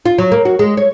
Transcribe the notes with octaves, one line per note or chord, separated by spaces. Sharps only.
F4
F#3
A#3
F#4
G#3
C#5